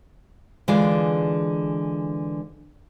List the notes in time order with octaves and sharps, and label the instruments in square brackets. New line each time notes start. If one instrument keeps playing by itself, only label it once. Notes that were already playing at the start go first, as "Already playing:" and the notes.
[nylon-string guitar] D3 E3 G#3 F4 G#4 D5